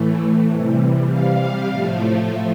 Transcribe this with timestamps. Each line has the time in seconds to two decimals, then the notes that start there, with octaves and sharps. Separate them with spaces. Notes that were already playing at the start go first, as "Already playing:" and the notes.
Already playing: A2 E3 A3
0.47 C3 E3 G3
1.08 C3 G3 F5
1.70 A2 F3 A3